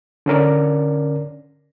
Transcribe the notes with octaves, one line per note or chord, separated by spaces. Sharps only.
D3 C#4 A#4 D5